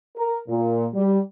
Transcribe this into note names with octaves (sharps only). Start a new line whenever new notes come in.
A#4
A#2
G3